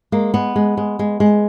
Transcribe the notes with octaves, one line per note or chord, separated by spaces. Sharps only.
G#3 A#3
G#3 B3
G#3
G#3
G#3
G#3